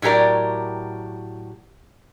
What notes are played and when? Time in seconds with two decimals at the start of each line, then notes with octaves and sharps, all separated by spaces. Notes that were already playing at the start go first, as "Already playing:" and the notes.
0.02 A2 F#3 G4 A#4 D5